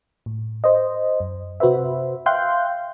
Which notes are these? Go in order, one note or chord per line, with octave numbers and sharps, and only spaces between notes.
A2
C5 D#5
F#2
C3 F#4 B4 C5 E5
E5 F5 G5 C6 F#6 G6